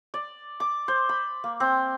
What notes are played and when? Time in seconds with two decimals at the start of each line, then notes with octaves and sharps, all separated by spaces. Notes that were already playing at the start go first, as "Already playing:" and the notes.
0.14 D5
0.60 D6
0.88 C5
1.09 B5
1.44 A#3
1.60 C4